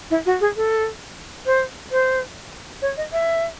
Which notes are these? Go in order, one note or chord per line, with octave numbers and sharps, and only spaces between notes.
E4
F#4
G#4
A4
C5
C5
C#5
D#5
E5